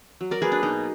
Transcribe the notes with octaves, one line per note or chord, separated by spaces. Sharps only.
F#3
A#4 D5
A#3 G#4 B4
D4
B2 D#4